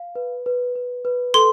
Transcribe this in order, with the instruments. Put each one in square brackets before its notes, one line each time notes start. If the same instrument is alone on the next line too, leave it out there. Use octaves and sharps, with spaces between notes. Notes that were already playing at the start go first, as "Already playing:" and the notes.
Already playing: [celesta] F5
B4
B4
B4
B4
[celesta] A4 [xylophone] C6